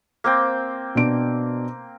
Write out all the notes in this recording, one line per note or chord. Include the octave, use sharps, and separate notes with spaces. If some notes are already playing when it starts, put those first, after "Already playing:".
A#3 C4 G5
B2 D4 D7